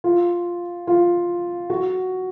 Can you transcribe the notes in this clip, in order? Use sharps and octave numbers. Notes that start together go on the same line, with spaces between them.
F4
F4
F#4